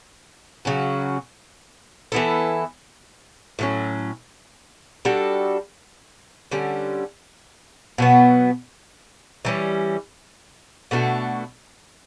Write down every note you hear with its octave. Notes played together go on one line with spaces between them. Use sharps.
C#3 F#3 C#4 F#4
E3 B3 E4 A4
A2 F#3 C#4
G3 D4 F#4 A4
D3 G3 C#4
B2 F#3 B3
E3 G3 C#4
B2 A3 D4 F#4